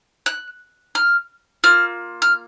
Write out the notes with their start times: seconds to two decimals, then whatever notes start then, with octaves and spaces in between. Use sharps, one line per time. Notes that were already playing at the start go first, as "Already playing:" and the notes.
0.26 F#6
0.95 F6
1.64 A#3 F4 F6
2.22 F6